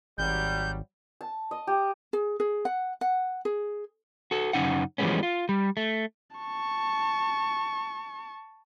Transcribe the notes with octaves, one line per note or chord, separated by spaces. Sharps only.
G#1 F#3 G3 G6
A5
D#5
G4
G#4
G#4
F#5
F#5
G#4
F#4 A4
F#2 C#3 C#4 D#4 F#5
E3 F3 G3 G#3 B3 C#4
F4
G3
A3
A5 C#6